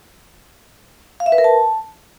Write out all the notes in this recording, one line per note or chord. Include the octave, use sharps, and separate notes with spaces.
F5
E5
B4
A#4
A5